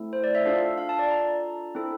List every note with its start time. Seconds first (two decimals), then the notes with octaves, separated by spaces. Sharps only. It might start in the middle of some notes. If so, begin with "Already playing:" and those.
Already playing: A3 C4 E4 A4
0.13 C5
0.24 D5
0.35 E5
0.46 D4 F4 A4 F5
0.78 F5
0.89 A5
0.99 D5
1.11 A#5
1.75 C4 E4 A4